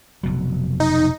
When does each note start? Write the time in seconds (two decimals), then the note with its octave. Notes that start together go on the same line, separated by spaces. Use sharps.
0.23 F1 B2 F#3
0.80 D#4